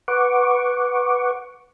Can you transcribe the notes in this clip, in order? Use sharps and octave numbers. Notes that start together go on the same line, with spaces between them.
B4 F#5 C#6 D6